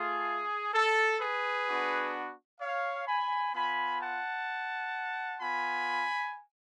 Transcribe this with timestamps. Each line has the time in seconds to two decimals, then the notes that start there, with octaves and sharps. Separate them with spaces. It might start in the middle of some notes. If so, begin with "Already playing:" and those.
Already playing: A3 F4 G#4
0.74 A4
1.20 G#4 B4
1.67 B3 D4 F#4
2.60 C#5 F5
3.07 G#5 B5
3.53 B3 F4 G#5 B5
4.00 F#5 A5
5.40 B3 F4 G#5 B5